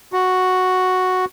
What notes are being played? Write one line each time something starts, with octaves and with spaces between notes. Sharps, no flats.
F#4